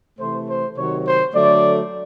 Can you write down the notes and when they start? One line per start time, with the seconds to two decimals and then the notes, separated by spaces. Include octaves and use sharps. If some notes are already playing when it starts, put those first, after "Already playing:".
0.18 C3 E3 A3 C5
0.48 C5
0.76 C3 D#3 F#3 C#5
1.05 C5
1.34 D3 F#3 A3 D5